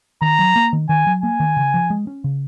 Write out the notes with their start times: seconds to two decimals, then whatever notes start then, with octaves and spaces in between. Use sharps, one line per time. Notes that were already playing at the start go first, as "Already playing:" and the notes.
0.22 D#3 A#5
0.39 F#3
0.56 A#3
0.73 D#3
0.89 D#3 G#5
1.07 F#3
1.23 A#3 G#5
1.40 D#3
1.57 C#3
1.74 F3
1.90 G#3
2.07 C#4
2.24 C#3